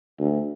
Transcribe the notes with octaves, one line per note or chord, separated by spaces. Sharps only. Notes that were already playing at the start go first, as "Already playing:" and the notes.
D2